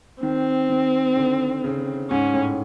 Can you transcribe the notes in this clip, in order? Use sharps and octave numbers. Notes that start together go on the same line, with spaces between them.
D#3 C4
D#3
D3
C#3
G#2 C#4
A2